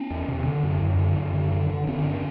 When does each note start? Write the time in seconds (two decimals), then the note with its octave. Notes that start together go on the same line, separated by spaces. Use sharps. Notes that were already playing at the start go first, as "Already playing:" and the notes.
Already playing: B3 C#4
0.10 E2
0.28 C3
0.46 D3
0.63 F#2
0.81 F#2
0.98 D3
1.16 F#2
1.34 D3
1.52 D3
1.70 D3
1.87 D3 B3 C#4
2.05 G2